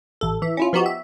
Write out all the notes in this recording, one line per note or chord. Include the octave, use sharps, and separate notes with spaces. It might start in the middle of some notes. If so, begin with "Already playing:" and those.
A1 A4
E3 E5
C#4 E4 F4
F3 B3 D#4 F#4 G4
E5